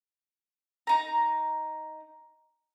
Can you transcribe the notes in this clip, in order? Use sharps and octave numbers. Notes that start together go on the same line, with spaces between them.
D#4 A#5